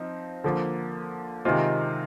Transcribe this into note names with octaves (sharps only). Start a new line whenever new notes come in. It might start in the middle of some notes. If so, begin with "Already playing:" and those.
Already playing: F3 C4 D#4
D3 F3 A#3
C3 D#3 G#3 C4 F4